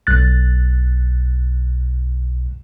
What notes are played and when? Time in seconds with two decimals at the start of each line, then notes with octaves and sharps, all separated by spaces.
0.07 B1 F#6 A6